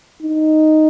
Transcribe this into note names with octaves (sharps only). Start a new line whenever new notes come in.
D#4